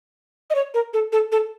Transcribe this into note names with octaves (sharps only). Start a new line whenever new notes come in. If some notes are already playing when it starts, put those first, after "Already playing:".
D#5
C#5
A#4
A4
A4
A4